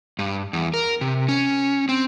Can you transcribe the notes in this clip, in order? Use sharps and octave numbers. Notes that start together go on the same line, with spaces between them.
G2
E2
A#4
C3
C#4
C4